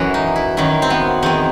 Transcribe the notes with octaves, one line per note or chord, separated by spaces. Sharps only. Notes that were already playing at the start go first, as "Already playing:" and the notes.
Already playing: F#2 E3 F#4 A4
D#4
E4
F#2 D#3 E4
C4
B3
E2 D#3 C4